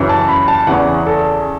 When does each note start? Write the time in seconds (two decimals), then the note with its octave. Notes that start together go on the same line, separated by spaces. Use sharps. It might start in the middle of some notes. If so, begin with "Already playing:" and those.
Already playing: F#2 C#3 E3
0.09 A5
0.28 B5
0.48 A5
0.67 E2 C#3 E3 F#5
1.07 A4